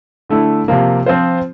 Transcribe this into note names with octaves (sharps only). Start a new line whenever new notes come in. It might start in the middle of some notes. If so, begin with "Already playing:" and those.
D3 A3 E4
C3 F3 A#3
F3 C4 F4 C5